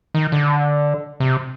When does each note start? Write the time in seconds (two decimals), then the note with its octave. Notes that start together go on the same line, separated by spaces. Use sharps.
0.14 D#3
0.32 D3
1.20 C3